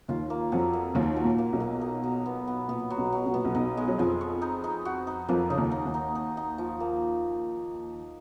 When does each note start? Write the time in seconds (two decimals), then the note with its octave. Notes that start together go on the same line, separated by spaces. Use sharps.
0.08 D#2 D#3 F4
0.30 A#3
0.52 F2 F3 F#3
0.73 A#3
0.95 D#2 D#3 F4
1.17 F#3
1.25 A#2
1.38 A#3
1.53 B1 B2
1.60 A#3
1.81 D#4
2.04 F#3
2.26 B3
2.47 B3
2.68 A#2 B3
2.90 F#3
2.98 B1 B2
3.12 F#3
3.26 B2
3.34 A#2 B3
3.45 B1 B2
3.55 B1 B2 D#4
3.77 G#3
3.88 F#3
3.98 F2 F3 G#3
4.21 C#5
4.42 D#4
4.64 D#4
4.85 F#4
5.07 D#4
5.28 F2 F3 A#3
5.50 C#3 D#4
5.57 D#2 D#3
5.72 D#4
5.86 D#2 D#3
5.94 D#4
6.15 D#4
6.37 D#4
6.58 F3
6.80 A#3